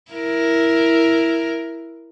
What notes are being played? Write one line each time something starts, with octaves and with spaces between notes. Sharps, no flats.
E4 A#4